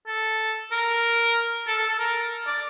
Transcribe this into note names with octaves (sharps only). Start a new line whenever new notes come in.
A4
A#4
A4
A4
A4
A#4
D5